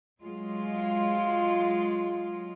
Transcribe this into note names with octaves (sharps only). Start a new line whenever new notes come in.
F#3 G#3 F4